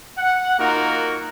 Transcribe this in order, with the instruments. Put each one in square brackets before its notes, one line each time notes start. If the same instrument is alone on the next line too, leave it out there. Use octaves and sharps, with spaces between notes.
[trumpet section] F#5
A#3 D#4 F4 F#4 A#4